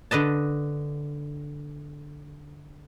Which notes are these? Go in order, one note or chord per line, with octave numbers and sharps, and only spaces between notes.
D3 B4 D#5 A5